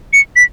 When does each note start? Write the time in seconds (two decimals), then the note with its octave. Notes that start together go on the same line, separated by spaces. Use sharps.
0.13 C#7
0.36 B6